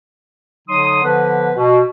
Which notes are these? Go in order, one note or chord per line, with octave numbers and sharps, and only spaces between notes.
D3 F#3 D#4 C6 D#6
D3 F3 B3 B4
B2